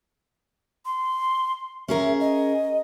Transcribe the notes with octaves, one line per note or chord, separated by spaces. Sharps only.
C6
C#4 G#4 A#4 E5
D#5